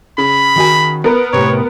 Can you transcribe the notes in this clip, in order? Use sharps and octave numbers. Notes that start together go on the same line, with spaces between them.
C#3 B5
D#3 F#4 G#5
B3 A#4 B4
A2 C3 C#5